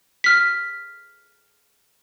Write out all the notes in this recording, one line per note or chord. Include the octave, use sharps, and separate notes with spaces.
F6 B6